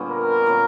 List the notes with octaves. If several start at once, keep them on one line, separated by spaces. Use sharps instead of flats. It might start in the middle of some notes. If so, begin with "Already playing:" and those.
Already playing: A#2 D3 G3 B3 C#4
A#4
A#2 G3 C#4